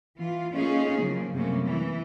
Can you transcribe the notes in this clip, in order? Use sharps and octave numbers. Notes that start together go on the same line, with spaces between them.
E3 F4
A3 A#3 C#4 D#4 F4 G#4
C#3 F3 F#3 A#3
F#2 C3 G3 A3 A#3 C#4
E3